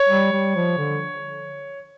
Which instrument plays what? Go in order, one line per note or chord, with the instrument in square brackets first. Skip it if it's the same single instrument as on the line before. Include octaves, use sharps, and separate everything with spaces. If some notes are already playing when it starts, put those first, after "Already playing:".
Already playing: [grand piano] C#5
[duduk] G3
G3
F3
D3